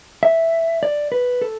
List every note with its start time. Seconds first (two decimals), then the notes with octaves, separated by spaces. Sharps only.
0.23 E5
0.83 D5
1.12 B4
1.42 A4